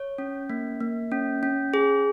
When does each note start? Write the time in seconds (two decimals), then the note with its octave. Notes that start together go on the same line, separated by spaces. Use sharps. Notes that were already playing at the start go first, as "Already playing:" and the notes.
Already playing: C#5
0.18 C#4
0.50 A#3
0.80 A#3
1.12 C#4
1.43 C#4
1.74 G#4